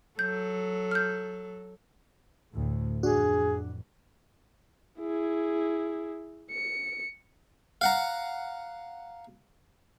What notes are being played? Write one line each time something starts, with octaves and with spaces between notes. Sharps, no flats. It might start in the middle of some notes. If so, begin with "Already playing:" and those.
F#3 A4 G6
F6 G6
D2 A2
A1 F2 D4 F#4 G#4
E4 G#4
C#7
F5 F#5 A#5